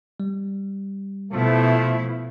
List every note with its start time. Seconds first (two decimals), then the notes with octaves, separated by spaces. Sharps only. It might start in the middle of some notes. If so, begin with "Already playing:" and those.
0.20 G3
1.32 B2 F3 A3 E4